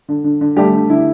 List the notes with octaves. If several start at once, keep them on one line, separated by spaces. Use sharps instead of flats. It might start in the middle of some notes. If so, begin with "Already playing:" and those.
D3
D3
D3
G3 A3 G4
D3
D3 E4